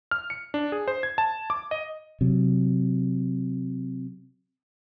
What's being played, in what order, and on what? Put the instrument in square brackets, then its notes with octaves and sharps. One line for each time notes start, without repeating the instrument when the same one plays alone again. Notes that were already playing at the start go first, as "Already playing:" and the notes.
[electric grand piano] F6
C#7
D4
G#4
C5
G#6
A5
D6
D#5
[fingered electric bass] C3 F#3